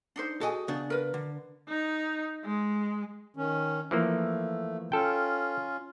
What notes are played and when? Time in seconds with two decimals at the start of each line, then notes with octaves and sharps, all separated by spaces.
0.16 D4 D#4 C5
0.41 F#4 G#4 A4 D#5 G#5
0.68 C#3 B3 D4
0.90 A#4 B4
1.14 D3
1.68 D#4
2.44 G#3
3.36 D#3 C#4
3.91 E3 F3 A3 A#3
4.92 C#4 F4 A4 G5